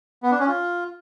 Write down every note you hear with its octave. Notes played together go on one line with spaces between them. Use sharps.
B3
D4
C#4
F4